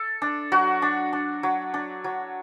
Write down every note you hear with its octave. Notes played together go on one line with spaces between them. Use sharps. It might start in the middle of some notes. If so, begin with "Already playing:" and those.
Already playing: A4
D4
F#3 F#4
D4
D4
F#3
D4
F#3